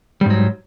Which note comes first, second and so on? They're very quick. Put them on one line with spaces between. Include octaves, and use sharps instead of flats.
G3 G#2 F#3